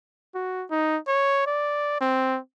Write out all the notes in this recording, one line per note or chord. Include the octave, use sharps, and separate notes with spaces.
F#4
D#4
C#5
D5
C4